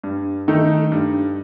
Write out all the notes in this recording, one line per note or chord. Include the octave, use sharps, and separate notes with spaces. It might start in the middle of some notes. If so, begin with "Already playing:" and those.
G2
D#3 A3 D#4
G2